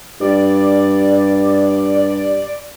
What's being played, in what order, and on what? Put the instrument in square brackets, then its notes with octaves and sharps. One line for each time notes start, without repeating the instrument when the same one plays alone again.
[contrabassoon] G2 [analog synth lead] D5